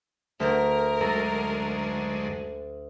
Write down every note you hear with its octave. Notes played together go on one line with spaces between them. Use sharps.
D2 A#4 G6
F#2 D3 G#3 A4 A#5